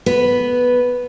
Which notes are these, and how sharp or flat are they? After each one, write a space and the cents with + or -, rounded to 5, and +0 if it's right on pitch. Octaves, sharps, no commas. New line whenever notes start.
B3 -5 B4 +0